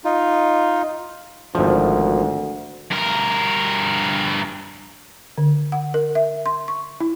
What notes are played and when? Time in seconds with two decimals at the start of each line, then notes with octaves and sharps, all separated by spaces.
0.05 D#4 F4
1.55 G#1 D2 F3
2.91 G2 A#4
5.38 D3
5.72 F#5
5.94 A#4
6.15 E5
6.46 C6
6.68 C#6
7.00 E4